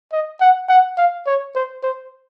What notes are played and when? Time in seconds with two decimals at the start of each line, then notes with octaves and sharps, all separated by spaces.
0.12 D#5
0.41 F#5
0.69 F#5
0.98 F5
1.27 C#5
1.55 C5
1.83 C5